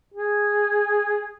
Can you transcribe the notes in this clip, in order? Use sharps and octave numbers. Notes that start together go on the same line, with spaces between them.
G#4